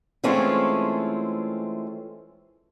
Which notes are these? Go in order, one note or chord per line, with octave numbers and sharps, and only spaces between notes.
E3 G#3 A3 C4 C#4 F4